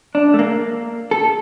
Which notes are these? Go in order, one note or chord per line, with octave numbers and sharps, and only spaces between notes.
D4
A3
A#3
A4